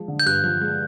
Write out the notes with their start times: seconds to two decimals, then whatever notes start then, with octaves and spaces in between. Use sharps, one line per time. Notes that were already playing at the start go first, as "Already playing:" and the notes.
Already playing: F3 G#3
0.08 D3
0.20 G6
0.26 G2 F#6
0.44 F3
0.61 G#3